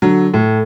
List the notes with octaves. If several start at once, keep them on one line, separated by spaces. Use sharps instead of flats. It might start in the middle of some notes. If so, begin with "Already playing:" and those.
D3 F#3
A2